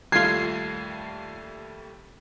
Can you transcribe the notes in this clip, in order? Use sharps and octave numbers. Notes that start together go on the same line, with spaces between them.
D#2 G3 A3 F4 G#6 C7